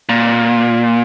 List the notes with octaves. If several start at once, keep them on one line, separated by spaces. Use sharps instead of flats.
A#2